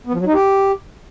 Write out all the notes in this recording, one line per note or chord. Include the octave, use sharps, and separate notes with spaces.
B3
F3
F#3
D#4
G4